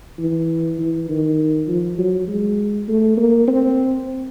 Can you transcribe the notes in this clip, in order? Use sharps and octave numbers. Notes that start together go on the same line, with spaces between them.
E3
E3
D#3
F3
F#3
G#3
A3
A#3
C4